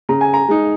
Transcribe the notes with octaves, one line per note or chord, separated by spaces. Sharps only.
C#3 A#5
G#5
A#5
G#3 D#4